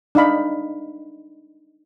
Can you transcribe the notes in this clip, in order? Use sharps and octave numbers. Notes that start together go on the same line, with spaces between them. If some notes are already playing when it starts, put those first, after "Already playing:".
D4 D#4 F5 B5